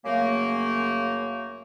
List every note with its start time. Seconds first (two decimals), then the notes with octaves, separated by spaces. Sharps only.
0.05 F#2 C#3 A3 A#3